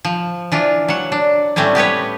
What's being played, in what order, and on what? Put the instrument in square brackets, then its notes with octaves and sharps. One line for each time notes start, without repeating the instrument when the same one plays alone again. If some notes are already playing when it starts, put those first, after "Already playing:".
[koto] F3
E3 D4 F4
F#3 F#5
D4
A2 G3 A3 C4 C#4
B3 G4 B4 C#5